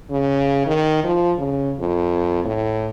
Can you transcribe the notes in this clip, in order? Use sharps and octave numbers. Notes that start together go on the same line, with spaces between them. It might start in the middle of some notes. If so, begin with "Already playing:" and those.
C#3
D#3
F3
C#3
F2
A2